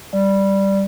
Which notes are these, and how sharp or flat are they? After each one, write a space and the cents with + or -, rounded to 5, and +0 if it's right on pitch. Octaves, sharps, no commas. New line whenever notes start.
G3 +0 D5 +0